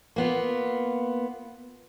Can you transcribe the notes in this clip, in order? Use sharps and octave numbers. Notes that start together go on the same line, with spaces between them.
A#3 B3 F4